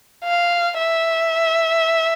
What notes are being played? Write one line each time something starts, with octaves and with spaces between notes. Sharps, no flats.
F5
E5